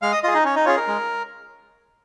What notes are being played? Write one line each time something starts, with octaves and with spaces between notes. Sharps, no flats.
G#3 F5 F6
D#5 D#6
F4 G#4 D#5 D#6
D#4 D#5
C#4 C#5
D#4 D#5
C#4 F4 G#4 C#5
A#4
G#3